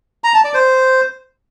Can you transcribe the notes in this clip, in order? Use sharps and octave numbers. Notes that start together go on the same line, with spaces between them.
A#5
A5
D5
C5